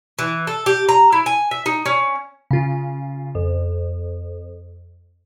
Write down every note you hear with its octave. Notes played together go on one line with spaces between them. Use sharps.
E3
A4
G4
A#5
E4
G#5
E5
D#4
C#4
C#3 F4
F2